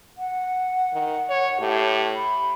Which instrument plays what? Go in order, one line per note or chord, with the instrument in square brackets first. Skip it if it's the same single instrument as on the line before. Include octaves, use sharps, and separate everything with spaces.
[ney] F#5
[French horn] D#3
C#5
[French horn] A2 [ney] G4
[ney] B5